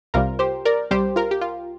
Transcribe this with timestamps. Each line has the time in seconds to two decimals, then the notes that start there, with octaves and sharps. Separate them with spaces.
0.14 C2 C3 G3 F4 A#4
0.39 G4 C5
0.65 A#4 D5
0.91 C2 C3 G3 G4 C5
1.16 F4 A#4
1.31 G4
1.41 F4